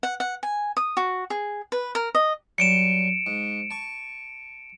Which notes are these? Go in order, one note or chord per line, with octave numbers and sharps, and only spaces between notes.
F#5
F#5
G#5
D#6
F#4
G#4
B4
A#4
D#5
F#3 G3 C#7 D7 E7
G#2
A5 C#6